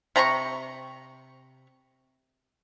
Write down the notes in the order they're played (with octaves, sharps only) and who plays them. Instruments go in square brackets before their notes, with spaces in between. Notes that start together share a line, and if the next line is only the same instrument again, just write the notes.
[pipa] C3 A#5 B5 C#6